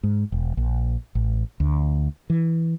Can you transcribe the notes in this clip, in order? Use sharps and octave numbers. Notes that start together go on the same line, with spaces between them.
G#2
E1
A#1
A1
D2
E3